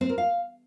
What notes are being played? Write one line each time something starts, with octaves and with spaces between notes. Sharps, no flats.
C4
A#4
F5